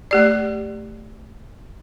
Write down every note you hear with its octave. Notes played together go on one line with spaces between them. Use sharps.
A3 G4 D5